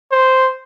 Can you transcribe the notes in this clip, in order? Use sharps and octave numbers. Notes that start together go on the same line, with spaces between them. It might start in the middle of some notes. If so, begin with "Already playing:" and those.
C5